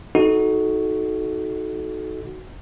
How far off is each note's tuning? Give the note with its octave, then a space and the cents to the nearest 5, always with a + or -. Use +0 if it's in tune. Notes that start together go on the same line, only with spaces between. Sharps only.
D#4 +15 F#4 +0 A4 -20